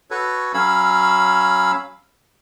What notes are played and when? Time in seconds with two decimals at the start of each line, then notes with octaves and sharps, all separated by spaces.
0.11 F#4 A4 B4 C#5
0.54 F#3 C#4 C#5 F5 B5 E6